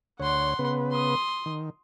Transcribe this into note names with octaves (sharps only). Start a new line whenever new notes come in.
D2 C#5 F#5 C6
C#3 B3 B4
C6 D#6
D#3